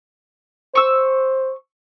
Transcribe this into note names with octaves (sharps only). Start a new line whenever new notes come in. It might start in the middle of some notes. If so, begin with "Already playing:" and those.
C5 C#6 E6